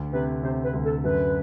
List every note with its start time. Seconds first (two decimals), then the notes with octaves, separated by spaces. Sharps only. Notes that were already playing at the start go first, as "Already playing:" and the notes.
Already playing: D2
0.12 C3 B4
0.43 C3 C5
0.64 B4
0.73 D2
0.84 A4
1.04 F#2 B4